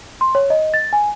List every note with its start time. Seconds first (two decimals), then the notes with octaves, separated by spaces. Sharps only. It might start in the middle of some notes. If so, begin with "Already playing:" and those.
0.21 C6
0.35 C#5
0.50 D#5
0.74 A6
0.93 G#5